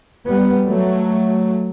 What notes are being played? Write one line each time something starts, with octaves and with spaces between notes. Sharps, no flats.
G3 B3
F#3 A3